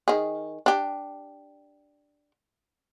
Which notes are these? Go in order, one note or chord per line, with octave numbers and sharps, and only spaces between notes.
D#3 G#4
D4 G4